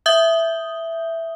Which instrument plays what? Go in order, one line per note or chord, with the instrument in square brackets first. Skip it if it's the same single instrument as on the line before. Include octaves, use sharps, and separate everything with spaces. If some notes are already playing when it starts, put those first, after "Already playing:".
[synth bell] E5 D#6 G6 G7